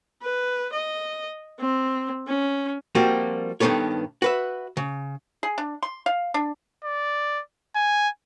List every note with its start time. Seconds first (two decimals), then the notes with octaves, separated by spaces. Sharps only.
0.22 B4
0.72 D#5
1.59 C4
2.27 C#4
2.95 F3 G3 A#3 C4 F#4
3.60 G2 D#3 F#3 B3 A4 C#5
4.22 F#4 B4 E5
4.77 C#3
5.43 G#4
5.58 D4
5.83 C6
6.06 F5
6.34 D4
6.84 D5
7.75 G#5